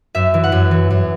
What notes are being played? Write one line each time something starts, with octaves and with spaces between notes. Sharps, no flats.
F#2 E5
E3
F#5
F#2
E3
F#2